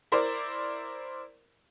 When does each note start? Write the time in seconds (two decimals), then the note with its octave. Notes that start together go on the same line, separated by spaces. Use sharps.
0.12 E4 A#4 C5 D5